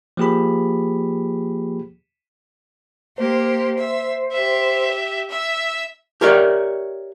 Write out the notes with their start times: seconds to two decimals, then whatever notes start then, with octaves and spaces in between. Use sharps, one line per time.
0.17 F3 A#3 G4 G#4 B5
3.18 A#3 G4 C5
3.79 E5
4.32 G4 E5
5.29 E5 E6
6.21 G4 A#4 C#5 D5 E5